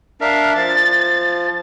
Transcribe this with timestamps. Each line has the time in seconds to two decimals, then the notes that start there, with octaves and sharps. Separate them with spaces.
0.21 D4 A#4 E5 F5
0.56 F3 A6